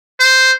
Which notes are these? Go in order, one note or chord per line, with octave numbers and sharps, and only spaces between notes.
C5